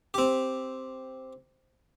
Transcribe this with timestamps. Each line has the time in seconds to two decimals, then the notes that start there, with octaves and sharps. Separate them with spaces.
0.14 C4 G4